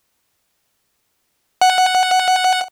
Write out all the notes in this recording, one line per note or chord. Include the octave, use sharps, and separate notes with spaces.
F#5